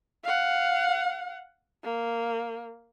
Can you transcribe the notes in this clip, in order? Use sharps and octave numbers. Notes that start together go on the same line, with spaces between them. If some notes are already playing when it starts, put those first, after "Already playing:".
F5 F#5
A#3